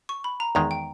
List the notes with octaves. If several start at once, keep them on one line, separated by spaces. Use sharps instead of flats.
C#6
B5
A#5
E2 D#3 G#3 A#5
G5